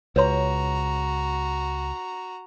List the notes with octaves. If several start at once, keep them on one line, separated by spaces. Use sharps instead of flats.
C#2 F#4 B4 C#5 A#5 C6